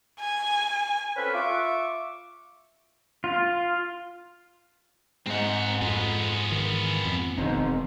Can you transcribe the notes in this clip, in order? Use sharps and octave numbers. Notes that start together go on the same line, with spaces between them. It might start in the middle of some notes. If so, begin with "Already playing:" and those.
G#5
C4 C#4 F4 A4 B4
F4 E5 C#6 D6
F4
G#2 C4 D#5 F#5
F2 G#3 B3
D#3 E3
F2
E1 D#3 C4 D#4